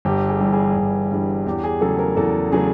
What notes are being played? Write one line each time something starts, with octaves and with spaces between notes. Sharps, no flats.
G1 G4
G#4
G2 E3 G3
G#4
G1
G2 E3 G3
E2 G4
G#4
C#3 F#3 A3 A4
A#4
E2 A4
C#3 F#3 A3 G#4